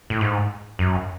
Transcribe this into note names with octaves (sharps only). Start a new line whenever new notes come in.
A2
G#2
F#2